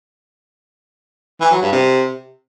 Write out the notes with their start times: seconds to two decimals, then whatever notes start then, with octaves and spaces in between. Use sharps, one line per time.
1.41 E3
1.51 F#3
1.62 G2
1.72 C3